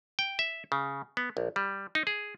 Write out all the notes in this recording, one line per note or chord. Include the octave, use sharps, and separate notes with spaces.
G5
E5
C#3
B3
A#1
G3
D#4
G#4